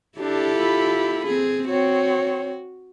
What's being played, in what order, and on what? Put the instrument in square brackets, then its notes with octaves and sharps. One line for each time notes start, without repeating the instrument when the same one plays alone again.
[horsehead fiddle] D4 [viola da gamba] E4 G4 A4
[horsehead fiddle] F4 B5
[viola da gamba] C4 G#4
[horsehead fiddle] C4 C#5 [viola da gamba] F#4